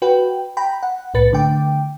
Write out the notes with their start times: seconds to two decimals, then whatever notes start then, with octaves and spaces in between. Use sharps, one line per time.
0.02 F#4 B4 G5
0.57 G5 A#5 B5
0.83 F#5
1.14 C2 A2 B4 A6 C#7
1.33 D3 A3 G5 D6